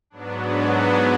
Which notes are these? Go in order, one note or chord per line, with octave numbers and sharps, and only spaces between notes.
G#2 F#3 B3 D4
D4
D4 F#4